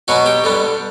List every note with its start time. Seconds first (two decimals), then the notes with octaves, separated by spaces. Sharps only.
0.08 B2 F#3 B3 F#4
0.26 G4
0.44 D3 G3 B3